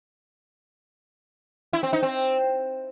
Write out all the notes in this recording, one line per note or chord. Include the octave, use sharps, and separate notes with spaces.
E4
C4
D#4
C4